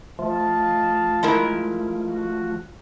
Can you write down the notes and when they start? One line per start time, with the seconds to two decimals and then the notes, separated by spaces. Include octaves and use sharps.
0.19 F3 A3 F4 D#5 F5 A5
1.23 G#3 E4 A#4
2.06 F#4